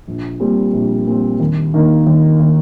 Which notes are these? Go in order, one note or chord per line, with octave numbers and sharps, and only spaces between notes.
A#1
A#2 G3 C4
A#1
A#2 G3 C4
D#2
D#3 A#3 D#4
D#2
D#3 A#3 D#4